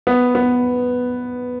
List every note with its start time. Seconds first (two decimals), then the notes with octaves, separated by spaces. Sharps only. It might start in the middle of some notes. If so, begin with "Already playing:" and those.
0.07 B3
0.35 B3